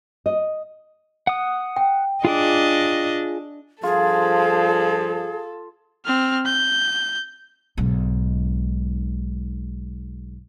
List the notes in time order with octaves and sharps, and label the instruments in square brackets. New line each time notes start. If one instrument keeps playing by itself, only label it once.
[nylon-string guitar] D#5
[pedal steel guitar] F#5 D#6
[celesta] G5
[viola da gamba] D4 D#5 [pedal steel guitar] F4 G#4 D6
[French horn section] G2 F3 [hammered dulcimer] F4 [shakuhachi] G#4 [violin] A4
[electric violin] C4 F6
G6
[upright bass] B1 G#2